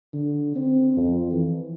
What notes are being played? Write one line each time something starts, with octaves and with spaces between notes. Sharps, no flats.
D3
C4
F2
E3